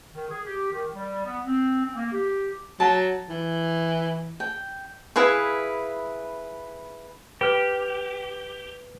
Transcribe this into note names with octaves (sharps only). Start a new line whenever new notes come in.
D#3
G#4
G4
D#3
G3
B3
C4
C4
A#3
G4
F#3 A5
E3
G5
E4 G#4 B4 F5
G4 B4 D6 F6